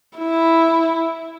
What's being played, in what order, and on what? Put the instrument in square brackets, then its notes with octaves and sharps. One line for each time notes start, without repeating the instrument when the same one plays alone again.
[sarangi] E4